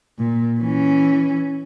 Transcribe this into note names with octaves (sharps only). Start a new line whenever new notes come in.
A#2
E3 C#4